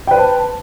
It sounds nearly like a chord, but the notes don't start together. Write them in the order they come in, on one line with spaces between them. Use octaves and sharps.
G5 B4 C5 A5